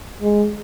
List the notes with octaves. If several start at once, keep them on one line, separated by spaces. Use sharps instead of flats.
G#3